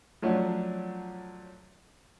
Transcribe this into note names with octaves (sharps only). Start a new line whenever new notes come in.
F3 F#3 A3 C#4 D4